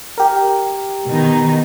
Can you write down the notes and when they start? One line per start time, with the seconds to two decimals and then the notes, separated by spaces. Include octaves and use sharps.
0.18 G4 A#4
1.08 B2 D#3 D#4